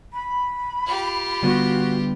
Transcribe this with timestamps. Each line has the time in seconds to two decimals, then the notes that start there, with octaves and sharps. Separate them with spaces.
0.13 B5
0.86 F4 G4
1.43 D3 G3 B3 F#4